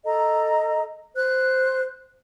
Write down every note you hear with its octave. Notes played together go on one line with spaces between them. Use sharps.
A4 D#5 A#5
C5 F#6